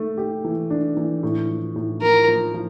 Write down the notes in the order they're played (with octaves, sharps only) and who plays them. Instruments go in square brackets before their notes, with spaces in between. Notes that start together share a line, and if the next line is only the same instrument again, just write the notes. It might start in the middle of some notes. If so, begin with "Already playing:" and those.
Already playing: [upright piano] A3
G4
E3
D4
E3
A2
F3
A2
[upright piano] F3 [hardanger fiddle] A#4
[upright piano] F3
F3